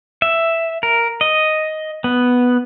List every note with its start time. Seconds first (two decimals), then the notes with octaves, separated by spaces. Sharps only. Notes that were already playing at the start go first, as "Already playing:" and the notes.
0.22 E5
0.83 A#4
1.21 D#5
2.04 B3